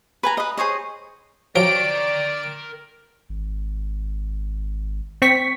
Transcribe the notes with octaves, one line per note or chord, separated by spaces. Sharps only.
B4 G#5 A#5
B4 D#5
G#4 C5 C#5 D#5
F3 F#3 A#4 D5 G5 D7
G#1
C4 C#6 B6